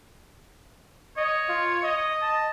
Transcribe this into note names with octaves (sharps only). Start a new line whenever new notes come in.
C#5 D#5
F4
D#5
A5